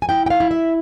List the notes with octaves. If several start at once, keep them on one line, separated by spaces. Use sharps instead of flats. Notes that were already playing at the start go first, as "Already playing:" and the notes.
G#5
E4 G5
G5
F5
E4
E5